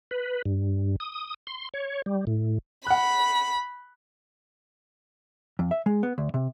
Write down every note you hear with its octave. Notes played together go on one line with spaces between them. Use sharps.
B4
G2
D#6
C6
C#5
G3
A2
F#5 B5 F#6
F2
E5
G#3
B3
D2
C3